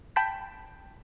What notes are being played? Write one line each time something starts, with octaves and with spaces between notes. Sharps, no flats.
G5 A5 B5 G6 B6